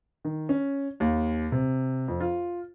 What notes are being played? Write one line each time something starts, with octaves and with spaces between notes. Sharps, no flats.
D#3
C#4
D#2
C3
F2
F4